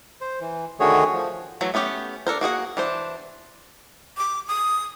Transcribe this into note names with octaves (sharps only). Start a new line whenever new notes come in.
C5
E3
D3 D#3 A3 F#4 G#4 C#5
F3
E3 F#3 A3
A3 B3 C#4 G4
D4 A4 A#4 C5
A#3 F#4 G#4 F#5
E3 D4 C5
D6
D#6